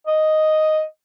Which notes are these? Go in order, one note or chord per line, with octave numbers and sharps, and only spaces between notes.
D#5